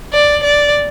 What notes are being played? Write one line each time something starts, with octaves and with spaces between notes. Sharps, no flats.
D5
D5